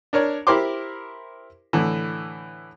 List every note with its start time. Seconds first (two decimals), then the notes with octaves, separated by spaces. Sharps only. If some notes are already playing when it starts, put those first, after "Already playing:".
0.13 D4 A#4 C#5 D5
0.47 E4 G4 A#4 C5 C6 D6
1.73 A2 D3 E3